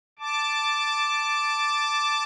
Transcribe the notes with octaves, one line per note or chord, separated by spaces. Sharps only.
A5 D6